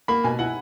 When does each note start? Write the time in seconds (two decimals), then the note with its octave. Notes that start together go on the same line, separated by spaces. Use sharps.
0.08 A#3 B5
0.24 B2 G#5
0.39 E4 F#5